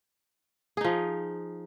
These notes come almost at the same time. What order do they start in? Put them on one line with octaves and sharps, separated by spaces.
G#4 D#4 F3